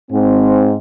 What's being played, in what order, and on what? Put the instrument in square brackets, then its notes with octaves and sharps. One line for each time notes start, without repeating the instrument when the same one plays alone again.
[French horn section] G#2 C4